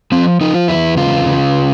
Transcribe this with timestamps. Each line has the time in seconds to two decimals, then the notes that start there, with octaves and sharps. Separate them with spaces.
0.12 F3 C4
0.41 F3 D#4
0.54 F4
0.68 E2 E4
0.97 C#3 F4
1.26 C#3